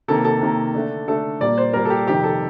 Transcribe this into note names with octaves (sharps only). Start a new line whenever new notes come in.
C3 D#3 A#3 A4
A4
C3 D#3 A#3
D3 A3 D4
D3 A3 D4 A4
A#2 G3 A#3 D5
C5
A#2 G3 A#3 A#4
A4
G4
F2 C3 D#3 G4
A4